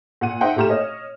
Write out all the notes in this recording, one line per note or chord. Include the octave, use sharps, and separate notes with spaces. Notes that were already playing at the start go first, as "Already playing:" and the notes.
A#2 F#5 D#7
D#4 C5 E5 F#5 G5
A#2 A3 G4 A#5 F6 E7
C#5 D#5